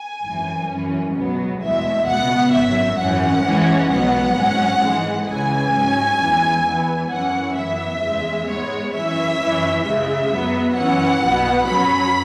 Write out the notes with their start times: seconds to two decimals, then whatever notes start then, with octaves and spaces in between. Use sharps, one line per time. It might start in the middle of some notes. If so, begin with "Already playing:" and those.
Already playing: G#5
0.24 G#1 F#2 E3
0.70 F#2 E3 C#4
1.14 C#2 B2 F#3 B3
1.61 E2 B2 G#3 E5
2.06 C#2 B2 B3 F#5
2.52 G#1 F#2 F#3 E5
2.98 G#1 F#2 E3 C#4 F#5
3.43 E2 E3 G#3 C#4
3.89 B1 B2 F#3 B3 F#5
4.35 G#1 G#2 F#3 C#4
4.81 G#2 E3 G#3
5.26 C#2 C#3 E3 G#5
5.72 G#2 F#3 C#4
6.18 E2 E3 G#3 C#4
6.64 E2 E3 B3
7.09 F#2 E3 C#4 F#5
7.55 F#2 E3 B3 E5
8.00 E2 C#3 G#3
8.47 G#2 G#3 B3 C#5
8.92 F#2 E3 C#4 E5
9.38 F#2 E3 C#4
9.83 C#2 C#3 G#3 E5
10.29 F#2 F#3 B3
10.75 F#2 E3 C#4 F#5
11.21 B1 B2 B3
11.66 F#2 F#3 C#4 B5